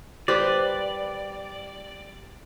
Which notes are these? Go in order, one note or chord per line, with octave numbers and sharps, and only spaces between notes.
G3 B4 C5 D5